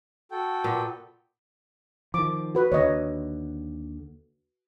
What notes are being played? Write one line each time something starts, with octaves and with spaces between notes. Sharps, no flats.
F#4 A4 G5
A#2 B3
D#3 F3 D6
F#4 B4
D#2 D3 C#5 D#5